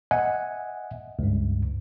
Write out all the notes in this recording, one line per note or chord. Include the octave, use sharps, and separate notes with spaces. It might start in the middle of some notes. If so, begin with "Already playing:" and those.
D#5 E5 F#5 G#5
C#2 G2